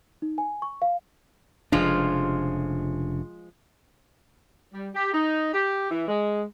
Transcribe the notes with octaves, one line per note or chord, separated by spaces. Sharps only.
D#4
G#5
C#6
F5
F1 C#3 F3 G#3 D4 F4
G3
G4
D#4
G4
E3
G#3